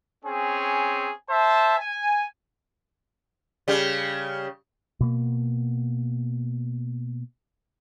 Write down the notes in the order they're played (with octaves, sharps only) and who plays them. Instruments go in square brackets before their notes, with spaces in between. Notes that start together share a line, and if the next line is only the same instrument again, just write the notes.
[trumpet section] C4 C#4 G#4
C5 E5 A5
G#5
[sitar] C#3 G3
[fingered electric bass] B2 A#3